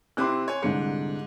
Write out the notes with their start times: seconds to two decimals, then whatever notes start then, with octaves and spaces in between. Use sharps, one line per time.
0.17 C3 C4 E4 C6 D6 F#6
0.48 C#5 G#5
0.62 C2 G#2 D3 C#7